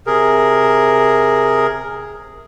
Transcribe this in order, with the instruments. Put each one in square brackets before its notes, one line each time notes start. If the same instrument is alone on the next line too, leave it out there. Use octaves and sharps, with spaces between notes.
[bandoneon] C3 G#4 A#4